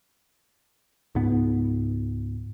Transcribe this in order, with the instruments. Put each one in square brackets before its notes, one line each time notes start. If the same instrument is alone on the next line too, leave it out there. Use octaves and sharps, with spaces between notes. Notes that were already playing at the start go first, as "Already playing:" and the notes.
[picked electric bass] C#2 G#2 B3